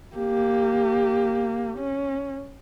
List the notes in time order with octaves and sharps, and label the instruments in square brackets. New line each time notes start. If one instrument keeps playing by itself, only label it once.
[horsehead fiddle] A#3 G4
C#4